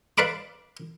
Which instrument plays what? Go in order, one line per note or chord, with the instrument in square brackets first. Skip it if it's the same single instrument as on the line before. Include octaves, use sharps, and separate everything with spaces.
[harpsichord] B4 D5 F5 B5 D6